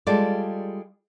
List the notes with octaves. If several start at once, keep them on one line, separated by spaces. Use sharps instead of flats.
G3 G#3 F4 A4 D5